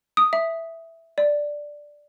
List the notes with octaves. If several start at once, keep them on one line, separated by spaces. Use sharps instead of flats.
D#6
E5
D5